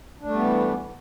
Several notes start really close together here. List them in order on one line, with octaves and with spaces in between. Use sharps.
D4 A3 G3 B3 E3